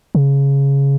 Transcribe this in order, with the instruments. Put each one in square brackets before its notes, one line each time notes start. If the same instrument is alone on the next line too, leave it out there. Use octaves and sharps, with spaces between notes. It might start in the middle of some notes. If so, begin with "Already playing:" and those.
[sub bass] C#3